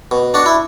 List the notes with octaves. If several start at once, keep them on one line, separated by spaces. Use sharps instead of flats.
B2
D4 F#4
E4